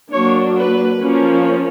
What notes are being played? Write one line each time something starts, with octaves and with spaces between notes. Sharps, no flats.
F#3 A#3 D4 C#5
B4
F3 A#3 C#4